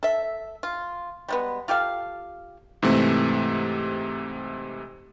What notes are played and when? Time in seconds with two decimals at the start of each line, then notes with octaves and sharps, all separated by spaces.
0.03 A4 E5
0.63 F4
1.28 G3 G#3 B3
1.68 F4 G4 A4 F5
2.82 G#2 C3 E3 A3 C4